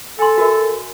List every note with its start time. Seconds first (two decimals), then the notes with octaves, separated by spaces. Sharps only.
0.19 A4 G#5 C6
0.38 F#4 A#4 E5